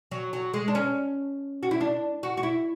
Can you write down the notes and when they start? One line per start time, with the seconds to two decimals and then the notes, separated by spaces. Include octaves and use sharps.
0.11 F#3
0.33 F#3
0.54 G#3
0.68 D4
0.75 C#4
1.63 F#4
1.71 E4
1.81 D4
2.23 F#4
2.37 F#4
2.43 E4